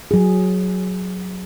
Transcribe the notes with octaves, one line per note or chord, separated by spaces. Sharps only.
F#3 G#4